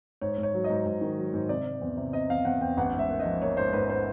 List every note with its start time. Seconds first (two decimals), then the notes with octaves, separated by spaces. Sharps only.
0.21 G#2 C#5
0.38 G#2
0.43 C#5
0.54 F#3
0.64 D#5
0.70 G#2
0.86 G#2
1.01 D#3
1.18 F#3
1.34 G#2
1.49 C3 D5
1.66 C3
1.81 E2
1.97 C3
2.13 C3 D#5
2.30 E2 F5
2.45 E2 F#5
2.61 E2 G5
2.77 A1 F#5
2.93 G#2
2.99 E5
3.09 A#3
3.20 D#5
3.25 F3
3.41 A#3 C#5
3.57 G#2 C5
3.73 G#2 B4
3.89 C5